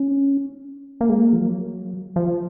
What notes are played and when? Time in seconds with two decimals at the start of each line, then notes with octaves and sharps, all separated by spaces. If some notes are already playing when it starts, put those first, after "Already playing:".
Already playing: C#4
1.01 A#3
1.09 G#3
1.18 A#3
1.33 F3
1.39 F#3
2.16 F3